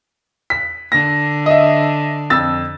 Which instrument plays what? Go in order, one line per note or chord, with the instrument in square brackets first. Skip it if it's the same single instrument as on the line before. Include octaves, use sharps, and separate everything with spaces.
[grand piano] B6
[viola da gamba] D3 [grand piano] A#6
[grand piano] D#5 E5
F2 E6 A6